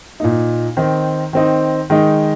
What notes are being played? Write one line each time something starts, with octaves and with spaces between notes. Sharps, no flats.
A#2 A#3 D#4
D#3 C4 D#4
D#3 C4 D#4
D#3 G#3 D#4